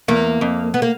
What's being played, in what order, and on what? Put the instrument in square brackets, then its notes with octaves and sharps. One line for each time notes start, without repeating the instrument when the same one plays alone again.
[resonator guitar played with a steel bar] E2 [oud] A#3
[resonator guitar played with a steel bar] F2
[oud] B3
A#3